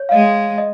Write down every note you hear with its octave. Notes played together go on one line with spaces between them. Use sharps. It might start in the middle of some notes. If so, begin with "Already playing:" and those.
Already playing: C#5
F5
G#3 D#5
D#5